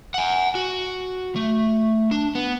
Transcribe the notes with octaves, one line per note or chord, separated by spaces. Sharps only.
F#5 G#5
F#4
A3
D4
B3